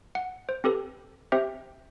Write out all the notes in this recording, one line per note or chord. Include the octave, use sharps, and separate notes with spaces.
F#5
C5
C4 G4 A4 B4
C4 G4 C5 E5